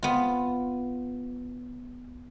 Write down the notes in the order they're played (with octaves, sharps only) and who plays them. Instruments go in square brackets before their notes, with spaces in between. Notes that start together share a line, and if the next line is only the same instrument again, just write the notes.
[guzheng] B3 F4